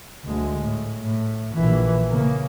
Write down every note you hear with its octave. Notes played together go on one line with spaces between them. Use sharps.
D2 G#3
A2
A2
A#1 E3
C#3 A#3